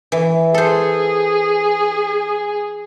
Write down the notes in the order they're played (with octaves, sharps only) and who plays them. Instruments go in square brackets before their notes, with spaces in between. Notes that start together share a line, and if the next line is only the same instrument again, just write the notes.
[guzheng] E3
[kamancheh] G#4 [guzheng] A4 C5